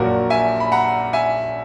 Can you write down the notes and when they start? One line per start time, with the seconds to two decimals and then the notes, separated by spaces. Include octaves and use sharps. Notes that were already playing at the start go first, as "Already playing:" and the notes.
Already playing: A#1 A#2 F#3 F#4 A#4
0.30 E5 G#5
0.60 B5
0.72 F#5 A#5
1.13 E5 G#5